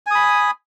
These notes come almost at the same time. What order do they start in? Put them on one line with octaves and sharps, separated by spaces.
G#5 D#6 B5